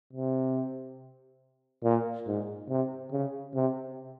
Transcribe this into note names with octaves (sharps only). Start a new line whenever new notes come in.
C3
A#2
G#2
C3
C#3
C3